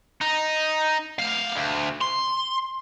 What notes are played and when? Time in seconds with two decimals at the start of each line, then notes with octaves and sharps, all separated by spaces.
0.21 D#4
1.19 A3 F5
1.55 D2
2.01 C6